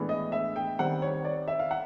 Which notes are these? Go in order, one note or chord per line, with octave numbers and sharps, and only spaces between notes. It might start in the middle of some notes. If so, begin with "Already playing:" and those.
Already playing: A2 E3 G#3 B3 D4
D#5
E5
G5
D#3 G3 C4 F#5
C#5
D5
E5
F5
F#5